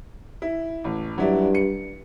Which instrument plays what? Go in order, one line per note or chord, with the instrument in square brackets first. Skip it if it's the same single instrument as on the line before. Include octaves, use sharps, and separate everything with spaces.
[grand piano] E4
A1
[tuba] G2 [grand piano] F#3 E4 D5
[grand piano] C#7